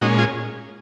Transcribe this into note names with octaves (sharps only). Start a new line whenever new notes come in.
A#2 G#3 C#4 D#4 F#4
F4 G#4